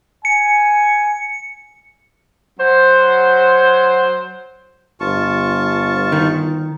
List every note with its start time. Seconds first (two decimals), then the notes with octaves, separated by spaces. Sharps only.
0.25 G#5 C#7
2.59 F#3 C5
5.00 G1 F4 A5 C#6
6.12 D#3